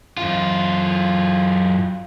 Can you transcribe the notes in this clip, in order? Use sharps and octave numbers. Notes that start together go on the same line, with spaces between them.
F#2 F4